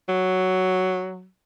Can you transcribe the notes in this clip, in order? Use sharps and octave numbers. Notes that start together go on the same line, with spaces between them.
F#3